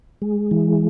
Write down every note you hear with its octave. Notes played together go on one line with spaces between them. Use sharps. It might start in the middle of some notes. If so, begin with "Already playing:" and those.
G#3
E3